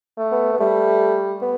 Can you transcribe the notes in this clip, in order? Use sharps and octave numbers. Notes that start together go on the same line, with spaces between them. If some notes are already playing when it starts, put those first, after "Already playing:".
A3
B3
B3
G3 A3
B3